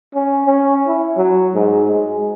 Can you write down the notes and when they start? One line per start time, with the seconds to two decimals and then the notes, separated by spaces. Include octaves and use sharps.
0.15 C#4
0.46 C#4
0.87 E4
1.17 F#3
1.55 G#2
1.89 G#3